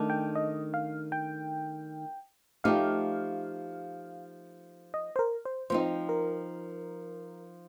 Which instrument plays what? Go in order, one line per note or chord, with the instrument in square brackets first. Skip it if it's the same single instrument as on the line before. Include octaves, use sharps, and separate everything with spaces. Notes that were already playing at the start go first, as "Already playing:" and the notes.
Already playing: [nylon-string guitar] D#3 A3 D4
[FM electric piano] G5
D#5
F5
G5
[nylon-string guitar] F3 A3 D#4 G4 [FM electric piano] F5
[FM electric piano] D#5
C5
A#4
C5
[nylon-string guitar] F3 C4 D#4 [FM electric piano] C5
[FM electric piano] A#4